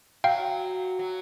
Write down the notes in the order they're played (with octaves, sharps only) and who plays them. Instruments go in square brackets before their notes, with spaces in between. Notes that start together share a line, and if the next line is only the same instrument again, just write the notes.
[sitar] F#3 [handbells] F5 G5
[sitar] F#3